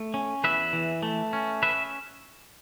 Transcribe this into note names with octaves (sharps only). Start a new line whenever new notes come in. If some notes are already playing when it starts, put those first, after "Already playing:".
Already playing: A3
C#4
E2 B4 E5
E3
A3
C#4
B4 E5